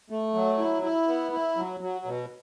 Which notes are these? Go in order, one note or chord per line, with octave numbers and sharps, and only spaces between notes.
A3
F#3
E4
E4
B3
E4
F#3
F#3
B2